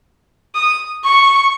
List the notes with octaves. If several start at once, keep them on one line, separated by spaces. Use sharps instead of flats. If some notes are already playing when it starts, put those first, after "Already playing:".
D#6
C#6